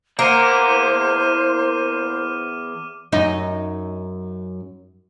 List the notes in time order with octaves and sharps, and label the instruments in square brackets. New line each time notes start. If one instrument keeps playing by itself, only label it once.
[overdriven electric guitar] E2 F#5 [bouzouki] A#3 [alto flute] C5 [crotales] D6 F6 D#7
[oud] F#2 D#4